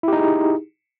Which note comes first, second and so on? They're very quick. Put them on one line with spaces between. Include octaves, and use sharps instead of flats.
E4 G4 D#4 G#4